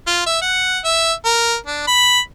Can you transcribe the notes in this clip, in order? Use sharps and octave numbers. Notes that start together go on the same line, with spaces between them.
F4
E5
F#5
E5
A#4
D4
B5